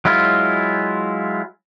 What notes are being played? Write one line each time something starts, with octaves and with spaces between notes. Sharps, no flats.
F#3 G#3 E4 F4